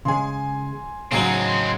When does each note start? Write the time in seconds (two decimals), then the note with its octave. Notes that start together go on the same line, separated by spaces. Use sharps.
0.05 C#3 G#3 G#5 C6
1.12 A2 C#3 F#3 G#3 C4 D#4